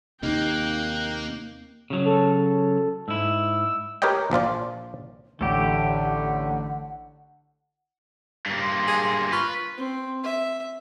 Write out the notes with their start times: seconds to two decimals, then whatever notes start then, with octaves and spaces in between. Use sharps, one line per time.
0.23 D#2 C3 A#3 D#4 G5 F#6
1.90 C#3 F#3
2.05 A4
3.08 G#2 E4 E6
4.02 G4 A#4 B4 C#5 D#5 G5
4.31 A#1 F3 F4 D5
5.41 A1 D3 A3 G4 F#5
8.46 G2 A#3
8.62 C6
8.87 G#4
9.32 F4 B4 C#6
9.78 C4
10.24 E5